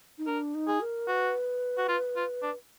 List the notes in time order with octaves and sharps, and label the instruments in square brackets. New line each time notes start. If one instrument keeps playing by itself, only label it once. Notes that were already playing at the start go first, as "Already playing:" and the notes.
[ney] D#4
[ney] D4 [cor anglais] A#4
[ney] D#4
[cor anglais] G#4
[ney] A#4
[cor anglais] F#4 [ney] B4
[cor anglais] F#4
F4
F4
D4